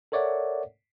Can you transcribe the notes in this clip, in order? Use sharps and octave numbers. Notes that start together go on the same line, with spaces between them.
A4 A#4 C#5 D5 E5 F#5